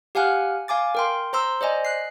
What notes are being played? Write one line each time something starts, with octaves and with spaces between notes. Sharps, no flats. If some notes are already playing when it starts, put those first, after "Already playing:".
G4 F5 F#5 G#5 F6 F#6
F5 G#5 D6 A6
A#4 G5 C6
C5 A#5 C6 E6
C5 D5 D#5 G#5
F#6 C7